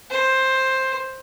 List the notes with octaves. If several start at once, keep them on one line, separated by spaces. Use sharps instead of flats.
C5